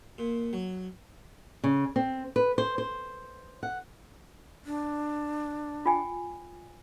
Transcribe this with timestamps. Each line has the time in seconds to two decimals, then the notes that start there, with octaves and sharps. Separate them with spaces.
0.18 A#2
0.53 F#3
1.64 C#3
1.96 C4
2.36 B4
2.58 C5
2.78 C5
3.63 F#5
4.65 D4
5.86 F4 G5 G#5